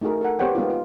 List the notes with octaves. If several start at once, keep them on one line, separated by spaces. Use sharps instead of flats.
A3 D#4 F#4 G#4 A#4
A4 A#4 F#5
B3 G4 C5 C#5 F#5 G5
G#3 B3 D#4 F4
F4